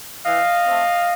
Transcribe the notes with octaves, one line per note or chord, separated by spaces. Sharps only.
E3 D#5 F5
A3 C4